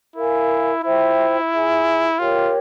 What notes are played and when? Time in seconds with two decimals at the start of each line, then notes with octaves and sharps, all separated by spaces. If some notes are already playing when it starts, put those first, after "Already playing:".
0.16 E4 A#4 F5 G#5
0.83 E4 F4 C5 E5 G5
1.51 F4 G#4 E5 G#5
2.18 F4 G4 A#4 C#5 G5